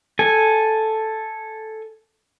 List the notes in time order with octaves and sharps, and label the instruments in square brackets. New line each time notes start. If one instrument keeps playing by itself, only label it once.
[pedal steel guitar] A4 G#5